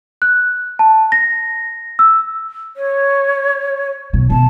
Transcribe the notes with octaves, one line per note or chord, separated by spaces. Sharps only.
F#6
A5
A#6
E6
C#5
B1 C#4
B2 A5